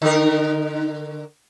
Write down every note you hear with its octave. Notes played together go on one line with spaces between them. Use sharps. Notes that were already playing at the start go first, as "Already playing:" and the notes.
D3 D#4 A#4